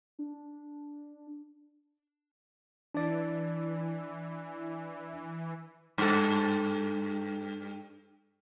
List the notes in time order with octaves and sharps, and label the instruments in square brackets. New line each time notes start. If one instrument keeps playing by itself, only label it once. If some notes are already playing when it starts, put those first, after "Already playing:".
[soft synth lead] D4
[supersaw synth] E3 [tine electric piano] D4 D5
[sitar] G2 A4